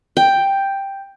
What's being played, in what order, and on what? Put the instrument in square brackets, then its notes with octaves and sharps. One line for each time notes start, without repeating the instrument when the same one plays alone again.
[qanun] G5